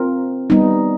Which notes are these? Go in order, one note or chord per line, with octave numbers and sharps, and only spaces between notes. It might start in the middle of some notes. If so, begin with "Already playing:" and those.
Already playing: C4 F4 A#4
G3 B3 D#4